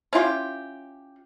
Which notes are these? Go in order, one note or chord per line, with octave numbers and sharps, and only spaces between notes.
C#4 E4 F4 G4